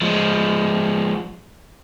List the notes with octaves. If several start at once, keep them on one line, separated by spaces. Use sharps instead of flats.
F3 G#3